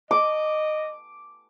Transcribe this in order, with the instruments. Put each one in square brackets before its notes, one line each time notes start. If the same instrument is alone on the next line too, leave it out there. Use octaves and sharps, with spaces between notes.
[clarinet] D#5 [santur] D6